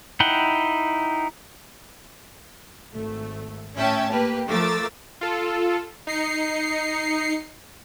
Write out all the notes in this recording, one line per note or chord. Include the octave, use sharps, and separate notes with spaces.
D#4 E4 F#5 G5
G#1 A3
A2 C#4 E5 G5 A5 G#6
A#3 G4 B4
F3 A3 A#4 D6 E6 A6
F4 A4
D#4 C7 C#7